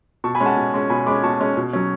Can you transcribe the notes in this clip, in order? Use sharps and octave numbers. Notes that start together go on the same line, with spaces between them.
B2 A5 C#6
G#5 B5
G#3 C#4
F#5 A5
B2
G#3 C#4
B2 G#5 B5
G#3 C#4 B5 D6
B2 A5 C#6
G#3 C#4
B2
F#3 C#4